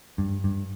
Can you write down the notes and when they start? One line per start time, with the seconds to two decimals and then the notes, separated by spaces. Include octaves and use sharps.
0.18 G2
0.44 G2